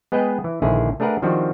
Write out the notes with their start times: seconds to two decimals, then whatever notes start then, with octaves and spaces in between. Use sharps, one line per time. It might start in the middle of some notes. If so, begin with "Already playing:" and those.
0.12 G#3 B3 G#4 B4 D#5 G5
0.44 E3
0.62 A#1 D3 D#3 E4 G#4
1.00 A3 D4 G#4 A#4 B4 F#5
1.22 D#3 F3 G3 C4 D4 F#4